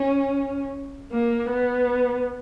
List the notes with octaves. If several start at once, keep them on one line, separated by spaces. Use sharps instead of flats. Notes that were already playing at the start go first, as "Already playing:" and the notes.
Already playing: C#4
A#3
B3